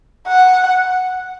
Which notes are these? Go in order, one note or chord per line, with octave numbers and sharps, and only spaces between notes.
F#5